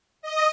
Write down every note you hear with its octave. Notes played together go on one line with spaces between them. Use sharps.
D#5